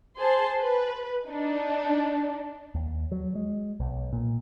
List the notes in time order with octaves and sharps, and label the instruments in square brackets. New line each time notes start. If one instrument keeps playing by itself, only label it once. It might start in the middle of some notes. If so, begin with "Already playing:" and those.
[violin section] G#4 C5 A5 C6
B4
D4 D#4
[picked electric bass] D#2
F#3
G#3
B1
A#2